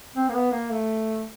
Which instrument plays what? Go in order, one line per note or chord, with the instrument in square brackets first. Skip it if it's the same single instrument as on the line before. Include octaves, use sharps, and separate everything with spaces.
[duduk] C4
A#3
B3
A#3
A3